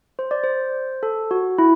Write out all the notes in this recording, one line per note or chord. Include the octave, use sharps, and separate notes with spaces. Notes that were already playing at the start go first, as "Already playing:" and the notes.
C5
D5
C5
A4
F#4
E4